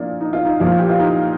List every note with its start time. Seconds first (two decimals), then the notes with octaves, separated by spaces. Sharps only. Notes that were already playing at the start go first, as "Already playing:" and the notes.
Already playing: A#2 F3 D4
0.20 D#4
0.33 F4
0.45 D#4
0.60 A#2 F3 F4
0.79 G4
0.89 F4
0.99 D#4